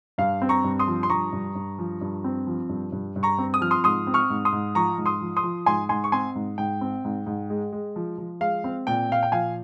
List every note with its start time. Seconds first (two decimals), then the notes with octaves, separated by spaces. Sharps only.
0.18 G2 F5
0.42 C4
0.49 A#5 C#6
0.64 G2
0.79 C6 D#6
0.88 F3
1.03 C6
1.10 G2 A#5 C#6
1.33 G2
1.55 G2
1.79 F3
2.01 G2
2.24 C4
2.47 F3
2.69 G2
2.92 G2
3.16 G2
3.23 A#5 C#6
3.38 C4
3.54 D#6
3.61 F3 F6
3.71 C6 D#6
3.84 G#2 C6 D#6
4.07 C4
4.14 C#6 F6
4.30 G#2
4.45 C6 D#6
4.52 G#2
4.75 F3 A#5 C#6
4.98 G#2
5.06 C6 D#6
5.21 F3
5.37 C6 D#6
5.43 F3
5.66 G#2 G#5 C6
5.89 G#2 G#5 C6
6.04 C#6
6.12 C4 G#5 C6
6.35 G#2
6.58 G#2 G5
6.81 C4
7.05 G#2
7.27 G#2
7.50 G#3
7.72 G#3
7.96 F3
8.18 F3
8.40 G#3 F5
8.64 C4
8.87 A#2 G5
9.09 A#2 F5
9.23 G5
9.32 F3 F5 G#5